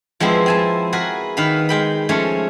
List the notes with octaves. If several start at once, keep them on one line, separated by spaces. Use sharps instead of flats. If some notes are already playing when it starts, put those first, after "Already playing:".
F3 G#3 B3 C4 E4
C4 G#5 A5
F#4 G#4 A#4 B4
D#3 B4 F5 B5
G#3 G5 B5
F3 G#3 A3 C#4 C#5